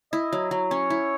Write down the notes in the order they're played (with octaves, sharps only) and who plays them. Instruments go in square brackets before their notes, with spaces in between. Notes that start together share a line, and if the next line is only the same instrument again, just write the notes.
[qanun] E4 [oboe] D#5
[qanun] F#3
F#3
[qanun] C#4 [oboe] C#5
[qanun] E4